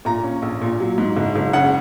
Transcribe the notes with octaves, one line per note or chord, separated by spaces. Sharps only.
A#2 A#5
C#4
A#1
A#2
F#3
G#2
F#1
F#1
C#3 F#5